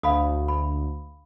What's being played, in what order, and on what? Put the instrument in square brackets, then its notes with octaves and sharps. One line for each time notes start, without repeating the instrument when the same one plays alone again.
[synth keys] D2 [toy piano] F5 B5 D#6
[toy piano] B5